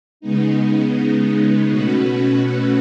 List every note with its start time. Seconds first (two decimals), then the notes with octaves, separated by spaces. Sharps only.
0.20 C#3 G#3 B3 D#4
1.69 B2 A3 C#4 F#4 B4